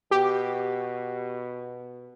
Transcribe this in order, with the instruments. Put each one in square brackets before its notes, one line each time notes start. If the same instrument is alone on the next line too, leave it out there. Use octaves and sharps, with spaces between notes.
[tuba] B2 [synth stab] G4